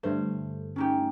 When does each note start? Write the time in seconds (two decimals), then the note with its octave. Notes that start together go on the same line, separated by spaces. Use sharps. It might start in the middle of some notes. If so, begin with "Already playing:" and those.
0.03 G2 D3 A3 C5
0.76 C#4 D#4 G4